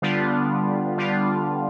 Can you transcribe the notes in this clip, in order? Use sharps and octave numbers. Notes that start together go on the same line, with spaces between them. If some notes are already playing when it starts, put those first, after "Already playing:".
D3 G3 B3 D4 F4
D3 G3 B3 D4 F4